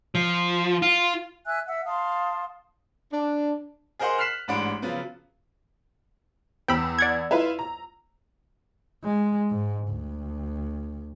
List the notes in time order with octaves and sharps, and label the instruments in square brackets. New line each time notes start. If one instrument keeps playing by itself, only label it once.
[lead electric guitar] F3
F4
[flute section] E5 G#5 E6 F#6
E5 F#5 E6
F5 A5 C6 D#6
[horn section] D4
[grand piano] G#4 A#4 C5 D#5 F#5 C6
F6 F#6 B6 C7 E7 F#7
A1 G#2 D4 F#5 B5 D7
C#3 F3 F#3 B3
[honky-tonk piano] E2 E6 [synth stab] G5 B5
[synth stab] D5 F#5 G#6
[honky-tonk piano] E4 F4 B4
A#5
[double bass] G#3
G#2
D2